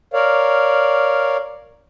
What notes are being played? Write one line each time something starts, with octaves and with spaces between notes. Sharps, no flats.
A#4 C#5 D5 F5